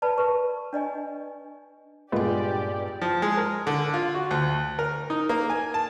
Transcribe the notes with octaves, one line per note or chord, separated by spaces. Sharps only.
B4 D5 A5 B5
A#4 B4 C#6
D4 D5 D#5 G#5
G2 A#2 G#3 B3 F4 G4 G#4 D5
F3
G#3
A#4
D3
F4
F#4
D2
A#4
D#4
A#3
G#5
A5